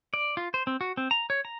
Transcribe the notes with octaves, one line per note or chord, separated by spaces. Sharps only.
D5
F4
C5
C4
F#4
C4
A#5
C#5
A#5